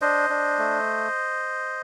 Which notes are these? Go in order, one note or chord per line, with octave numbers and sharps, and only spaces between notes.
D4 C5 D#5
D4
A3